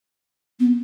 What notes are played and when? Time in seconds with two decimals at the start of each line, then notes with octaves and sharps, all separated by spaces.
0.59 B3